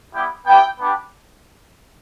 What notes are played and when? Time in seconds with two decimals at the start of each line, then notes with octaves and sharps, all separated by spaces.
0.13 G3 B3 E4 G4 G5
0.46 B3 E4 G4 G5
0.79 B3 D4 G4